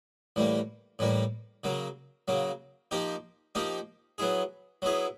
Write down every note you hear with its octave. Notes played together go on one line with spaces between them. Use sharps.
A2 E3 G3 A#3
A2 E3 G3 A#3
C#3 F#3 A#3
C#3 F#3 A#3
F3 A#3 D#4 G4
F3 A#3 D#4 G4
F#3 B3 E4 G#4
F#3 B3 E4 G#4